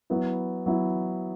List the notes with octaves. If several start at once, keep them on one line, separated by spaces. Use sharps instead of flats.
F#3 B3 E4
F#3 B3 E4